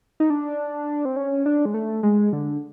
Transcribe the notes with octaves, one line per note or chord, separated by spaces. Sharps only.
D#4
D4
C4
C#4
D4
G#3
A3
G#3
D3